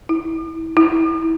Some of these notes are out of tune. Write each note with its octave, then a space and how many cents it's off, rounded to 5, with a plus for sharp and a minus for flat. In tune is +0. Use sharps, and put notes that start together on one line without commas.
E4 -25
E4 -25